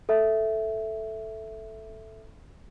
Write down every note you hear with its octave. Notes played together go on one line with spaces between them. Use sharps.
A4 E5